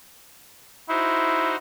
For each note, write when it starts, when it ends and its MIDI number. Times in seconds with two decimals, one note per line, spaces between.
0.89 1.56 63
0.89 1.56 64
0.89 1.56 66
0.89 1.56 72